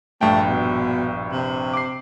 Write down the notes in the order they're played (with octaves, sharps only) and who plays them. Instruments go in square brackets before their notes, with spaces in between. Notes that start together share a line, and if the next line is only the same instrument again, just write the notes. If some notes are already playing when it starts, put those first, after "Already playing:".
[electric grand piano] A#1 G2 G5 [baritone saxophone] A3
[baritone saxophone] B2
C3
[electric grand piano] D6 C7